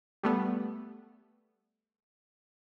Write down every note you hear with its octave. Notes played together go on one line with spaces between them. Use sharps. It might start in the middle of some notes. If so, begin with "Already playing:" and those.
G3 A3 B3